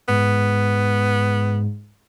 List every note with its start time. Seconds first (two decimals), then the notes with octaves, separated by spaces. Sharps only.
0.08 G#2 B3